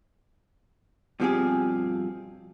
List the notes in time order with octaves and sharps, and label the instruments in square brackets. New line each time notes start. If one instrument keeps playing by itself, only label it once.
[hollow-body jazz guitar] G2 B2 F3 C4 G4 G#4